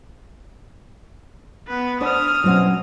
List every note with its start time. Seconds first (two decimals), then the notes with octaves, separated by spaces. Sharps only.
1.68 B3 B4
2.01 D4 C5 D5 D#6 F6
2.44 B2 F#3 C4 C#4 E4 F#4